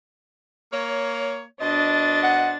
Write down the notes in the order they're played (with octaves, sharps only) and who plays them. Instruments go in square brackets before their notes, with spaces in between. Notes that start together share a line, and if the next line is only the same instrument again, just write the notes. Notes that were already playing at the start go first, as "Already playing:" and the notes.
[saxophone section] A#3 C#5
[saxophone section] B2 C5 D#5 [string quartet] D4 A6
[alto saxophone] F#5